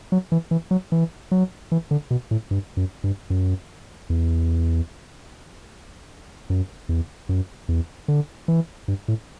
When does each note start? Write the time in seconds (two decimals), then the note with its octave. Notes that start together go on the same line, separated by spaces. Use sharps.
0.12 F#3
0.32 E3
0.51 E3
0.71 F#3
0.92 E3
1.31 F#3
1.72 E3
1.91 D3
2.11 B2
2.31 A2
2.51 G2
2.77 F#2
3.04 G2
3.30 F#2
4.10 E2
6.50 F#2
6.89 E2
7.29 F#2
7.69 E2
8.08 D3
8.48 E3
8.88 G2
9.08 A2